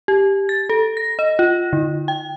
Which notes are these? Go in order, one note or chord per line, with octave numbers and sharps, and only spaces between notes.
G4
A6
A4
A#6
D#5
F4
D3
G5